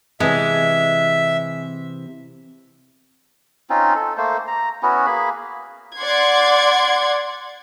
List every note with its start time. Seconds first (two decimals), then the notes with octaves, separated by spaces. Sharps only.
0.20 C3 E3 G#3 E5
3.70 C4 C#4 D#4 F4
3.95 A4
4.18 A3 A#3 C5
4.47 A#5
4.83 B3 C#4 E4 F#4
5.06 A#3 G#4 B5
5.97 D5 F#5 C6 G#6